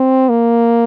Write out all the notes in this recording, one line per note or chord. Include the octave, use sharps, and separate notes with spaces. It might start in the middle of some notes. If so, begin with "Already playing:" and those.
Already playing: C4
A#3